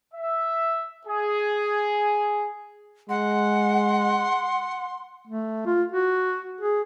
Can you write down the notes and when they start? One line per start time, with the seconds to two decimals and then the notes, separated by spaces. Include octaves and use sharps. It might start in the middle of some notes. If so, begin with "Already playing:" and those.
0.14 E5
1.07 G#4
3.09 G#3 F#5 C6
5.27 A3
5.66 F4
5.92 F#4
6.61 G#4